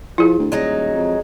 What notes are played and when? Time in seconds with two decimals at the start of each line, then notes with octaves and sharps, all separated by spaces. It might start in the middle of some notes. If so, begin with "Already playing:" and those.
0.18 F3 E4 G#4
0.39 D2
0.52 D#1 F#3 G#3 D#4
0.95 F2